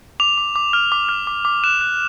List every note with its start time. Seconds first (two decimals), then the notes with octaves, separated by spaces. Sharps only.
0.20 D6 F7
0.38 D6
0.56 D6
0.73 F6
0.92 D6
1.09 F6
1.27 D6
1.45 D6
1.64 F#6 E7
1.81 F#6